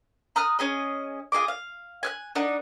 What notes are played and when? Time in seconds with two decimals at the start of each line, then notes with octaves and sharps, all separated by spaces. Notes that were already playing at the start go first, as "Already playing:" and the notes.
0.36 A#5 D#6 F6 F#6
0.59 C#4 G#4 D#5
1.32 F4 G#4 D#5 D6
1.48 F5
2.03 G#5 F6 F#6
2.35 D4 D#4 A#4 F#5